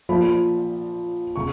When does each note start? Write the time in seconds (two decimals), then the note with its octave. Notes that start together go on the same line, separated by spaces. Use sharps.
0.09 A#1 A#2 F3 B5
1.36 C#3 C#6